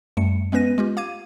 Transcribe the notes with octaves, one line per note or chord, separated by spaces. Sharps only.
F#2 G3 A3 C#7
G#3 B3 C#4 B4 A#6 D#7
G#3 F4 G4
F5 D6 G#6 D#7